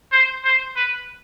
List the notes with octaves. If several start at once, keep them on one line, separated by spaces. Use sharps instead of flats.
C5
C5
B4